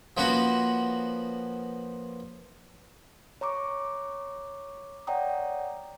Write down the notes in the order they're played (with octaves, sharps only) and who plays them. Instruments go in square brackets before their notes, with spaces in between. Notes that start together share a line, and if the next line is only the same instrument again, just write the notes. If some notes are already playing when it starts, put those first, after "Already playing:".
[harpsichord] F3 A#3 B3 C#4 F#4
[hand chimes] C#5 A#5 C#6 D6
C#5 D5 F#5 G5 A#5 D#6